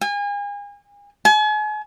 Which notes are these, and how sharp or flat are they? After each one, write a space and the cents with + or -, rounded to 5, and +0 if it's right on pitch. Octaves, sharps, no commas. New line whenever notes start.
G#5 -35
G#5 +40